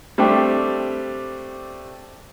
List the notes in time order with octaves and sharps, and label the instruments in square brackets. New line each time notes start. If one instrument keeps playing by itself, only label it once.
[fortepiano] G3 A3 C4 D4 G4